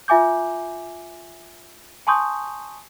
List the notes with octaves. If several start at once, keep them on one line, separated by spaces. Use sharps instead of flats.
F4 E5 G#5 D6 G6
G#5 A5 C6 C#6 D#6 G6